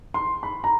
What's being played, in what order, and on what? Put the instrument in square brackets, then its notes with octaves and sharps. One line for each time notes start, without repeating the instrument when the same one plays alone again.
[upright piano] C6
B5
A#5